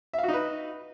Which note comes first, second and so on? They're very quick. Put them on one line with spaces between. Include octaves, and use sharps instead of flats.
E5 F5 F#4 D#4 B4